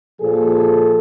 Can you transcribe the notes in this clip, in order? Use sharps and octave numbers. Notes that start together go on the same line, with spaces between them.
A#2 F3 G#4 A4